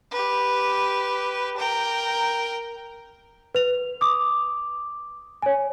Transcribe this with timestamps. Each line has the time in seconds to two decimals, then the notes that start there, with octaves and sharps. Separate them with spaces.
0.11 G4 B4
1.57 A#4 G5
3.55 B4 F7
4.01 D6 D#6
5.42 C#5 G#5